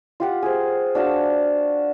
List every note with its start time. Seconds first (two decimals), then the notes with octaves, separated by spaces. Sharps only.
0.20 F4 G4 F#5
0.42 G#4 C5
0.95 D4 F#4 F5 A5